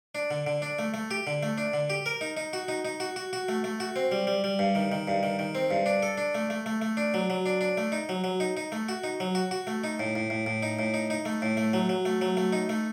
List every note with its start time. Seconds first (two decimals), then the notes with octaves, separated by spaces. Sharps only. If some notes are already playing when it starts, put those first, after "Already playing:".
0.15 D4
0.31 D3
0.47 D3
0.62 D4
0.79 A3
0.94 A3
1.11 G4
1.27 D3
1.43 A3
1.58 D4
1.73 D3
1.90 G4
2.06 A#4
2.21 D#4
2.37 D#4
2.53 F#4
2.68 D#4
2.85 D#4
3.00 F#4
3.16 F#4
3.33 F#4
3.48 A3
3.64 A3
3.80 F#4
3.96 C4
4.12 G3
4.27 G3
4.44 G3
4.59 G2
4.75 D#3
4.92 D#3
5.07 G2
5.23 D#3
5.39 D#3
5.55 C4
5.71 G2
5.86 D4
6.03 A4
6.18 D4
6.35 A3
6.50 A3
6.66 A3
6.82 A3
6.97 D4
7.14 F#3
7.30 F#3
7.46 D4
7.61 D4
7.77 A3
7.92 D#4
8.09 F#3
8.24 F#3
8.40 D#4
8.57 D#4
8.72 A3
8.89 F#4
9.04 D#4
9.20 F#3
9.35 F#4
9.51 F#4
9.67 A3
9.84 D#4
9.99 A2
10.15 A2
10.30 A2
10.46 A2
10.63 D#4
10.79 A2
10.94 D#4
11.10 D#4
11.25 A3
11.42 A2
11.57 A3
11.73 F#3
11.89 F#3
12.05 A3
12.21 F#3
12.37 A3
12.53 D#4
12.69 A3